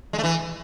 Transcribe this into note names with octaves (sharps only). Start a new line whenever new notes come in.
G#3
A3
E3